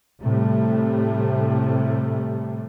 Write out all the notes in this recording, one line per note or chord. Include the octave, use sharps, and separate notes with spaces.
A2 C3 G3 A3